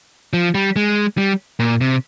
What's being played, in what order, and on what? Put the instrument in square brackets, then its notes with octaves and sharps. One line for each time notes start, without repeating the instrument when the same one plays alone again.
[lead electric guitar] F3
G3
G#3
G3
A#2
C3